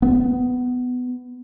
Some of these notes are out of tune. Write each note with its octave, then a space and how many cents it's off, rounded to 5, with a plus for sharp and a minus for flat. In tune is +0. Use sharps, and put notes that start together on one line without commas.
B3 +15